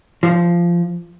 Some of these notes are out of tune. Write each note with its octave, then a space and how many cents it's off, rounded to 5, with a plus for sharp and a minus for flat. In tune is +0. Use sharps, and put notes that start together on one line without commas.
F3 -15